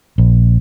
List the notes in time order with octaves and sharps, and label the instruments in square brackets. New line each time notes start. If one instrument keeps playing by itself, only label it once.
[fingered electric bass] A#1